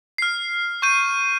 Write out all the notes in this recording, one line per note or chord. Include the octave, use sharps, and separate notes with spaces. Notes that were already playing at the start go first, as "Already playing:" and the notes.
F6 C7
C#6 G6 D#7